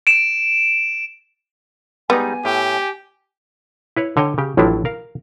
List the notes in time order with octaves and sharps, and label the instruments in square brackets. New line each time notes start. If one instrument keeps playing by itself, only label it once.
[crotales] D7 E7
[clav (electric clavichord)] G3 G#3 D#4 [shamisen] B3 [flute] G#5
[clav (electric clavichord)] A2 [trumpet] G4
[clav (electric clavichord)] E4 B4 C#5
D3 C#5 D#5 G5
C#3 G4
A1 A2 F3 F#3 D4 E4
A#4 F5